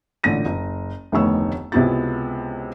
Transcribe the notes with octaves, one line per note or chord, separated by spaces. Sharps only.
A1 A#2 D3 A#6 D#7
F#1
F1 D2 D#3 B3 C#5 E6
C#2 C3 B3 E4 F#4 A6